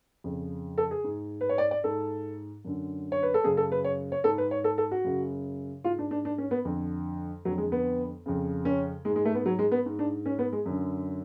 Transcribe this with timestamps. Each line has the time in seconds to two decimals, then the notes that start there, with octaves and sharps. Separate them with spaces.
0.24 F2 C#3
0.78 A4
0.91 G#4
1.04 G#2
1.41 B4
1.49 C#5
1.58 D5
1.71 D5
1.84 G#2 A4
2.65 F#2 D3
3.12 C#5
3.23 B4
3.34 A4
3.44 F#2 C#3 G#4
3.57 A4
3.72 B4
3.85 C#5
4.12 C#5
4.24 G#2 A4
4.38 B4
4.51 C#5
4.64 A4
4.78 A4
4.91 F#4
5.04 F#2 C#3
5.84 G#2 F4
5.99 D4
6.11 D4
6.25 D4
6.38 C#4
6.51 B3
6.65 F2 D3
7.45 F2 D3 F#3
7.58 G#3
7.72 B3
8.26 F2 C#3
8.65 C#4
9.05 G#2 G#3
9.16 G#3
9.25 A3
9.35 B3
9.46 F#3
9.59 G#3
9.72 B3
9.86 G#2
9.99 D4
10.26 C#4
10.39 B3
10.53 G#3
10.66 F#2 D3